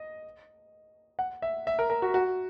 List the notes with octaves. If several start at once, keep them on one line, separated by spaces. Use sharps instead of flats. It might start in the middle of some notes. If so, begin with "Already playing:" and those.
Already playing: D#5
F#5
E5
E5
A#4
A#4
F#4
F#4